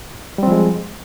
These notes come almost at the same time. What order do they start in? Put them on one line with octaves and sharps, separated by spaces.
G3 C4 F3 G#3